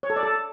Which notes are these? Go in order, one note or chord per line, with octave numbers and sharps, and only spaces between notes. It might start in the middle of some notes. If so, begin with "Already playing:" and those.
C#5
A4
D5
A4